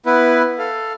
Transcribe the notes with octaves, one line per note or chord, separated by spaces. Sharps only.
B3 E4 B4
A4 F5